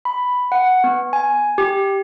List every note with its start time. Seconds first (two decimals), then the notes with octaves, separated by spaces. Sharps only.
0.05 B5
0.52 F#5
0.84 B3
1.13 G#5
1.58 G4